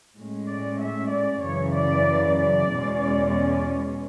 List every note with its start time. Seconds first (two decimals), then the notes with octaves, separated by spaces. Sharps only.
0.16 A2 G#3 C#4
0.48 D5
0.79 E5
1.11 D5
1.43 F#2 C#3 E3 C#5
1.75 D5
2.39 D5
2.71 E2 B2 G#3 C#4
3.03 D5
3.34 D5